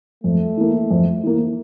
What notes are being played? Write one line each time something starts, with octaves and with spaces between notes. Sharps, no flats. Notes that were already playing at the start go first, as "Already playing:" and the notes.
F2 A3
E3 A#3
F2
E3 A#3